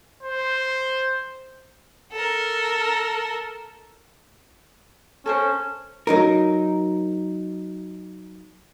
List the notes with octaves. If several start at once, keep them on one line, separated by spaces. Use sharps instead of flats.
C5
A4 A#4
C#4 A4 A#4 C5
F#3 D#4 A#4